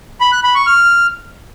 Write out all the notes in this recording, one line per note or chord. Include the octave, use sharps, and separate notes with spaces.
B5
F#6
B5
C#6
F6